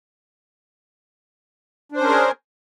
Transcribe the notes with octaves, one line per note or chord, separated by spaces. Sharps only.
C#4 D4 G#4 A#4 C5